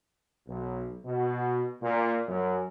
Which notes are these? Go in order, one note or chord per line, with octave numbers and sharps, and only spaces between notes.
B1
B2
A#2
F#2